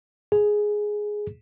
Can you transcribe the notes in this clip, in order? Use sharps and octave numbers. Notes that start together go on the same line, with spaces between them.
G#4